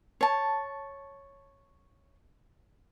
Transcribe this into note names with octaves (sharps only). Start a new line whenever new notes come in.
C#5 A5